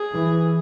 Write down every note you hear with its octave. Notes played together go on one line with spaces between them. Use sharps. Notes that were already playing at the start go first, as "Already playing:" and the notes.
Already playing: G#4
E3